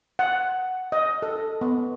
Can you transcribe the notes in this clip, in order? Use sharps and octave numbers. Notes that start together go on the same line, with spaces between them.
F#5
D#5
A4
B3